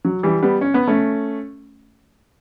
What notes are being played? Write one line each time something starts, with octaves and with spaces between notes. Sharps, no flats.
F#3
E3 G3
G3 B3
C#4
B3
A3 C#4